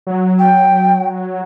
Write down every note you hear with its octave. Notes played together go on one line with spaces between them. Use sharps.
F#3
G5